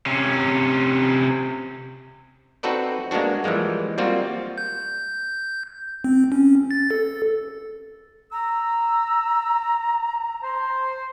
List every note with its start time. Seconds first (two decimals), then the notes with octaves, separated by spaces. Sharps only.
0.06 C3 C#4
2.63 C4 D#4 F#4 A4 B4 D5
3.11 G#3 A#3 B3 D4 F#4
3.44 E3 F3 G3 G#3 A#3
3.98 G3 A#3 C4 F4 F#4
4.58 G6
6.04 C4
6.32 C#4
6.71 A6
6.91 A4
8.32 A#5 E6
10.43 C5